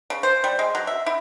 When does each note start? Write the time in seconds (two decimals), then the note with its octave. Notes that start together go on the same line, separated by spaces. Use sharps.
0.10 C#3
0.23 C5
0.44 G3
0.59 G#3
0.75 F#3
0.87 E5
1.06 E4